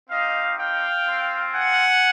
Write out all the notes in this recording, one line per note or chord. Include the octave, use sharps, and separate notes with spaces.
C4 D#4 G4 D#5 F5
F5 G5
C4 F4
F#5 G#5